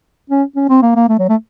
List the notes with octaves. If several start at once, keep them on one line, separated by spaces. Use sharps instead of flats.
C#4
C#4
C4
A#3
A#3
A3
F#3
A3